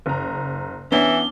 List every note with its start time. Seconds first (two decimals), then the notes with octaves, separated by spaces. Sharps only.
0.06 F#1 A#5
0.92 E3 B3 C#4 D4 G7